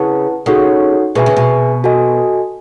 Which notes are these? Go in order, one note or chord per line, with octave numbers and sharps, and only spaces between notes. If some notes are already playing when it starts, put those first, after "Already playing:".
Already playing: C#3 E4 B4 F#5 A5
C#3 D#4 F#4 A4 C#5 F#5
B2 G#4 B4 E5 G#5
C#3
B2
F#4 A4 D#5 G#5